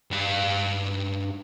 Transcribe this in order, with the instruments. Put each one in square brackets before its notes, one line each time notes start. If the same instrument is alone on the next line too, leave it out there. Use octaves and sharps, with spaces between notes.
[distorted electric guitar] G2 F5